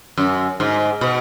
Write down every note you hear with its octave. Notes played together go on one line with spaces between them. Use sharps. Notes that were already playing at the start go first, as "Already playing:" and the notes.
F#2
G#2
B2